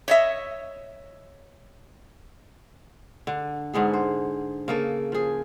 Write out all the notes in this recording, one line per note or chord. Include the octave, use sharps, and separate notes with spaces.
C#5 D#5 E5
D3
G#2 D3 B3 G#4
C5
C#3 A#3 A4
F3 G#4